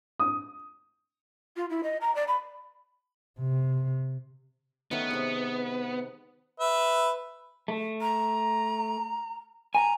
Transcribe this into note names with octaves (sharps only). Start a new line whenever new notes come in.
D#6
F4
E4
D#5
A#5
D5
B5
C3
D#3 A3 B3 C#4
C3 G#3
B4 E5
A3
A#5
G#5 A#5